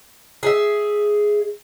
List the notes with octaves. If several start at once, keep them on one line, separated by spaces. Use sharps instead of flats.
G#4 E5